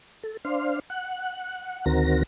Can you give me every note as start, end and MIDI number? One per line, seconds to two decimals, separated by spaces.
0.23 0.37 69
0.45 0.80 62
0.45 0.80 72
0.45 0.80 77
0.90 1.85 78
1.86 2.23 38
1.86 2.23 51
1.86 2.23 60
1.86 2.23 66
1.86 2.23 70
1.86 2.23 94